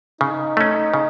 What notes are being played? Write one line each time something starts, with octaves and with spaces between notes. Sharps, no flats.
C#3 D#4
A3 C#4
C#3